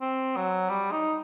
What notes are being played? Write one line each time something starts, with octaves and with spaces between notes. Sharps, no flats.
C4
F#3
G3
D#4